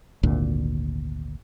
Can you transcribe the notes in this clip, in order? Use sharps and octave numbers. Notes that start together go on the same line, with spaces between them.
G#1 D2 A#2